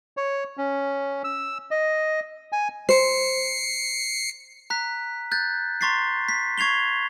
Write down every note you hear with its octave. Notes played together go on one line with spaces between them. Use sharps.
C#5
C#4
E6
D#5
G#5
C5 C7 C#7
A#5 F#6 B6
F#6 G6 A6
A#5 C6 C#6 A6 B6 C7
B6
C#6 G#6 C7 F7 G7